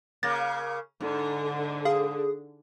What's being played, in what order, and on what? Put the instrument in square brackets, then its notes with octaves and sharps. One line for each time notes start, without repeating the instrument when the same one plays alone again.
[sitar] C#3 A#3 [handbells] A6 A#6
[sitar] G#2 [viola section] D3
[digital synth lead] G#4 [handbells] F5